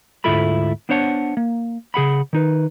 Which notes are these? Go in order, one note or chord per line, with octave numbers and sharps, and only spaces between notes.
D2 G#2 E4 F4 A4 B5
B3 D4 C5 C#5 F#5 A5
A#3
C#3 G#4 F#5 B5
D#3 D#4 B4